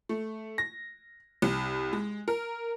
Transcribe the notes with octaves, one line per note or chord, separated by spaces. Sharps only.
A3
A#6
C2
G#3
A#4